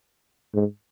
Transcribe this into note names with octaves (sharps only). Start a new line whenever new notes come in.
G#2